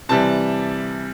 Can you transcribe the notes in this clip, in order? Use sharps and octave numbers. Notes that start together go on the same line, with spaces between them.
C3 E3 G3 A5